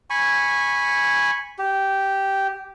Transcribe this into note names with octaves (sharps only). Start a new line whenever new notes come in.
G#5 B5 C#6
G4